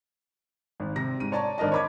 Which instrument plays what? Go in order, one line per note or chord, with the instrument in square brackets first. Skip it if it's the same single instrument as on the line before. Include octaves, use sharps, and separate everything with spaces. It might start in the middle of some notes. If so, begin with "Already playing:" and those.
[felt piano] G#1
C3 A#6
G#2 D#7
C#5 D5 A5 A#5 C#6
G#1 D4 A#4 D#5 A5
C#5 D#5 B5 D6 G#6